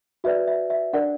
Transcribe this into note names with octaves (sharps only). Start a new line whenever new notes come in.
F#4 B4 D5 E5
E5
E5
D4 A#4 D5 F#5